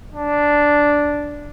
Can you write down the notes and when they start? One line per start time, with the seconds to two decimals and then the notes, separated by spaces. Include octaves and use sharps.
0.12 D4